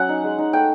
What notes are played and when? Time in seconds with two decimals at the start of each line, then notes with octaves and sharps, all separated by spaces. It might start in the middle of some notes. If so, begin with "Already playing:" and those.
Already playing: F#3 C#4 F#5
0.09 D#4
0.24 G#3
0.39 D#4
0.53 A3 G5